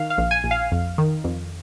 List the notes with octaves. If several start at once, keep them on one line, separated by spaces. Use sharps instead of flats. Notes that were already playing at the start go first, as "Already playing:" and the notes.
Already playing: D#3 F5
F5
A#1
G#5
A#1
F5
F2
D#3
F2